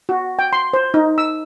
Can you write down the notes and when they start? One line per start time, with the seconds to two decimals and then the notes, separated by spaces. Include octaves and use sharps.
0.09 F#4
0.39 G5
0.53 C6
0.73 C5
0.94 D#4
1.18 E6